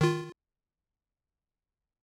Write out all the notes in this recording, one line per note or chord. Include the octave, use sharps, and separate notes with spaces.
D#3 F4